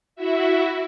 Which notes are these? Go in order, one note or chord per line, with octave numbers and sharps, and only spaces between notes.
E4 F#4 E5